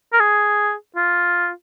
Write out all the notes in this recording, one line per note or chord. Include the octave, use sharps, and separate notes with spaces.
A#4
G#4
F4